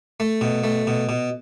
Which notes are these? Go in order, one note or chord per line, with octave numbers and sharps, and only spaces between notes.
A3
B2
A3
B2
B2